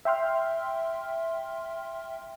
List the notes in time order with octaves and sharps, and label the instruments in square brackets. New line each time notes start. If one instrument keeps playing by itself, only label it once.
[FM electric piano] E5 G5 C6 F6